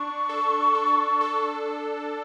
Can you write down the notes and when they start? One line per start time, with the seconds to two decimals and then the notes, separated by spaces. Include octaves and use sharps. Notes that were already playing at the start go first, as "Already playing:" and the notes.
Already playing: D4 C#6
0.29 A4
0.75 A4
1.21 A4